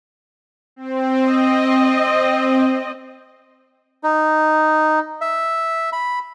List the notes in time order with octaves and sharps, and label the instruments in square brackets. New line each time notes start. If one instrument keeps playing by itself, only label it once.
[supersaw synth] C4
[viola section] D#5
[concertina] D#4
E5
B5